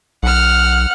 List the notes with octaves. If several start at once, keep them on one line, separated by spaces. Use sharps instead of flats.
B1 F#5 F6